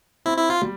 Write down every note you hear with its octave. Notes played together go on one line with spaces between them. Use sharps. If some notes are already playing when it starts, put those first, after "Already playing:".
C4 E4
E4
F4
G3